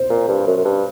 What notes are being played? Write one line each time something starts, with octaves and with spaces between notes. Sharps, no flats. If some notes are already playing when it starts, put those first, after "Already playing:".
Already playing: C5
A#2
G2
F#2
F#2
G2